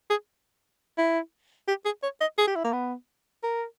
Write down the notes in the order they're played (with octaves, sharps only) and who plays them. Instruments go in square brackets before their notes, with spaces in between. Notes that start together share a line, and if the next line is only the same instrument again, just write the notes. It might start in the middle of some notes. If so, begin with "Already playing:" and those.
[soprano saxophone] G#4
E4
G4
G#4
C#5
D#5
G#4
G4
E4
A#3
B3
A#4